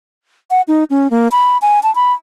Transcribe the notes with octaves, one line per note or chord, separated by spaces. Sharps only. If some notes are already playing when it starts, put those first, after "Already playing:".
F#5
D#4
C#4
A#3
B5
G#5
A5
B5